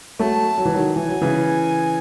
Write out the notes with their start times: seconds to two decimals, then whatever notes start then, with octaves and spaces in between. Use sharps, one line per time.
0.19 F#3 A3 A5
0.58 F#3
0.65 E3
0.74 D#3 F#3
0.96 E3 G#5
1.09 F#3
1.21 C#3 E3